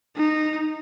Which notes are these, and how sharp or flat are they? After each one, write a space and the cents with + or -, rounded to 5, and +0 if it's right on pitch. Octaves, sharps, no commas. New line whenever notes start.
D#4 -15